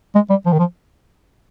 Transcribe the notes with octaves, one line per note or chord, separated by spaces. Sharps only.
G#3
G3
F3
D#3
F3